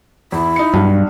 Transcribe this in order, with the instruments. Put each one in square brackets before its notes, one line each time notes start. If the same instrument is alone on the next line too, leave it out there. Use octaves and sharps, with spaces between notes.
[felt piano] E2 [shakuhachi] E4
[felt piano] D#4 C#7
[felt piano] B1 [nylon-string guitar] G2